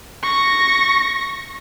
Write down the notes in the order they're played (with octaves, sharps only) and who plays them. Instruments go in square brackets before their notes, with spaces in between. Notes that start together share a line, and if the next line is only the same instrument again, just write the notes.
[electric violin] C#6 A#6